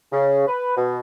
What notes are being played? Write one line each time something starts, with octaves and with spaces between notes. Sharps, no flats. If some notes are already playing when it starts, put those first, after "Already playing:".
C#3
B4
B2